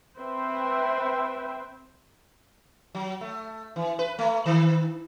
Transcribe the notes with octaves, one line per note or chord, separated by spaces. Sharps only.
C4 B4 C5 E5 G5
F#3
A3
E3
B4
A3
D#3